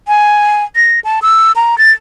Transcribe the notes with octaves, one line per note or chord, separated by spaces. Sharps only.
G#5
A#6
A5
E6
A#5
A6